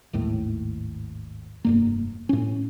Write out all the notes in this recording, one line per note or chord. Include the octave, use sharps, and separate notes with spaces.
G#1 D#2 A2
F1 G2 A#3
A2 C#4